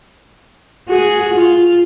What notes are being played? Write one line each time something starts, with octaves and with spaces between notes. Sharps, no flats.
F#4 G#4
F4